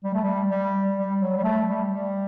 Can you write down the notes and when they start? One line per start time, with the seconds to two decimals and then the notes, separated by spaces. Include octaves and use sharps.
0.04 G3
0.14 A3
0.23 G3
0.51 G3
0.97 G3
1.21 F#3
1.38 G3
1.43 A3
1.67 G3
1.91 G3